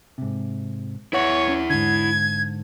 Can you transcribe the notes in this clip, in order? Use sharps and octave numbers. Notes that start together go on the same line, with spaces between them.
G#2 C3
E4 B4 C#5 F#5
C#4
G#2 D3 G#6